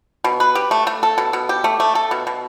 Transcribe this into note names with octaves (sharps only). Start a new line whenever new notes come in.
B2
B4
G4
A3
A3
A4
B2
B2
G4
A3
A3
A4
B2
B2